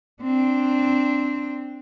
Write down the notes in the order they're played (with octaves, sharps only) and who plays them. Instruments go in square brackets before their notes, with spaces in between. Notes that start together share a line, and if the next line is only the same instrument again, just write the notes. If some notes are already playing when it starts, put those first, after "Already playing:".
[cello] C4 D4